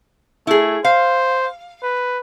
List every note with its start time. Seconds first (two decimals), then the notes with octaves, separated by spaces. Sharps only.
0.47 A3 E4 G#4
0.84 C5 F5
1.83 B4